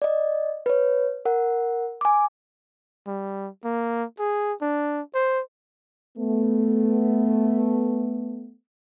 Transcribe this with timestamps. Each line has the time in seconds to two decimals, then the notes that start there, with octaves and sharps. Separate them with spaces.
0.02 D5 D#5
0.66 B4 C#5
1.25 A#4 F#5
2.01 G#5 D6
3.07 G3
3.65 A#3
4.19 G#4
4.62 D4
5.15 C5
6.17 A3 B3